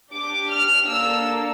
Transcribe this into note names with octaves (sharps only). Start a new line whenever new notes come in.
D4 G4 D6
F6
A#3 D4 A4 E6